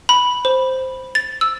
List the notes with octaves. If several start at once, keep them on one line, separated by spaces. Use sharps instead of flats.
B5
C5
A6
E6